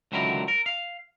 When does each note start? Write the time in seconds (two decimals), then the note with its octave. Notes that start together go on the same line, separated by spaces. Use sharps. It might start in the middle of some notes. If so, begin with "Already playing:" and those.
0.12 C#2 D3 D#3 F#3 E4 A#4
0.48 A#4
0.66 F5